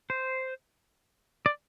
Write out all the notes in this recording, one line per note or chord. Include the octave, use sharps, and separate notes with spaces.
C5
D5